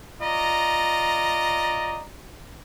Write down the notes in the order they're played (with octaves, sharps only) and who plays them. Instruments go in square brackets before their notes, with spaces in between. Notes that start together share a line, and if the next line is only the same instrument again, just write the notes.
[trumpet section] F4 D5 D#5 A#5